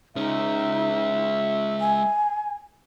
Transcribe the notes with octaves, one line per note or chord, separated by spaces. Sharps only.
G#3 C#4 D#4 E5
G#5